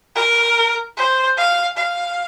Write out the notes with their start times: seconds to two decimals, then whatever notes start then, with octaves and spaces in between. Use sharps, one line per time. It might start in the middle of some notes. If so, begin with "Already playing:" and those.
0.16 A#4
0.97 C5
1.37 F5
1.77 F5